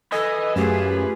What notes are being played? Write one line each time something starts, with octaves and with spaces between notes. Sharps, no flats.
A4 B4 D#5 G#5
F#2 A3 F4 G4 G#4